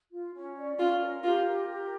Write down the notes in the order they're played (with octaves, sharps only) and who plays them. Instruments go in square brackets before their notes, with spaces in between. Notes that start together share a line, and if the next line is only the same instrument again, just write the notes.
[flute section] F4
C#4
D5
[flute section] C#4 [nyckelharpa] F4
[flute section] A#4
[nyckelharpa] F4 [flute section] G4
[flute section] A#4
G4